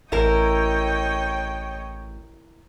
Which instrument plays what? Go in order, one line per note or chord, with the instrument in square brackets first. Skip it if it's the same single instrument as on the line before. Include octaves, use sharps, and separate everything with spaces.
[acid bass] A1 [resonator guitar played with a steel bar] E4 A#4 [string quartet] C#5 D#5 G5